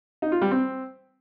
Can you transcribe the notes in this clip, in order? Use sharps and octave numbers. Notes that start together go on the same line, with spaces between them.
D#4
F4
G3
C4